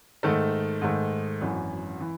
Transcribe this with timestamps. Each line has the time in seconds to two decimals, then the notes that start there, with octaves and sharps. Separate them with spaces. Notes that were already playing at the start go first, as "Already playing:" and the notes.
0.23 G#2 D#3 A3
0.81 G#2 D#3 A3
1.41 G#1 F#2 E3
2.01 E3